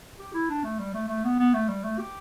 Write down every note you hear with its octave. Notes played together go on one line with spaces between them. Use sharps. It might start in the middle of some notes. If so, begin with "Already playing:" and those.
G4
E4
D4
A3
G3
A3
A3
B3
B3
A3
G3
A3
G4